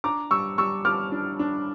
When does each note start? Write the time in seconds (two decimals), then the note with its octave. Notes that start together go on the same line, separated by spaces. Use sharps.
0.04 D4 A#5 D6
0.31 G3 C#6 E6
0.58 G3 C#6 E6
0.85 G3 D6 F6
1.12 D4
1.39 D4